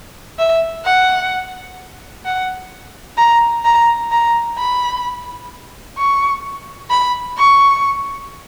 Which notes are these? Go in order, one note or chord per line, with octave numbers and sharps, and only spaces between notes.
E5
F#5
F#5
A#5
A#5
A#5
B5
C#6
B5
C#6